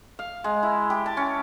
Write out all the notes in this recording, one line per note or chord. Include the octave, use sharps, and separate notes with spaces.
F5
G#3
E4
G4
A5
C#4